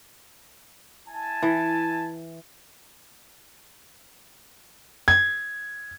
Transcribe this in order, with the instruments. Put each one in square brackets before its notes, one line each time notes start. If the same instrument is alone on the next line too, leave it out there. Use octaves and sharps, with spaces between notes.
[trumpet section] E4 G#5 A5
[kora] E3
[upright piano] G#6